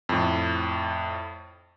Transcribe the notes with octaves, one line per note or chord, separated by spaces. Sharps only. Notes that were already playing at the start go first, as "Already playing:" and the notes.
F2 A2